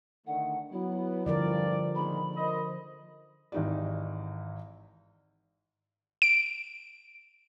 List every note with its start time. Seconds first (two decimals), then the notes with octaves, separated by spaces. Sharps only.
0.27 D3 D#3 A3 F#5
0.72 F#3 B3 E4
1.26 G2 D3 F3 A#4 D5
1.95 A#2 D#3 G#3 B5
2.36 A#4 C5 D#5
3.52 G#1 E3 D#4 G4 D5
6.22 D7